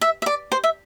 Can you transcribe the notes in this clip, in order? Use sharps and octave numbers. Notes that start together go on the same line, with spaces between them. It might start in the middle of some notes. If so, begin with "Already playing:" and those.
E5
E5
D5
C5
E5